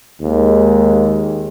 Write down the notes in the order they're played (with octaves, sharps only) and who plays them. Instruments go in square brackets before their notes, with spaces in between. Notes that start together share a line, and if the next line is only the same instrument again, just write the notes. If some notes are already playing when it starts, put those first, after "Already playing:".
[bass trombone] D#2 [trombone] G#3